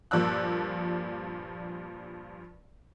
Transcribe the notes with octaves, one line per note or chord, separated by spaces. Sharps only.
G2 A#2 F3 D5 E6 F#6